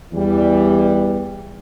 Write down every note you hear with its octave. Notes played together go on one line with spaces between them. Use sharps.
E2 E3 G3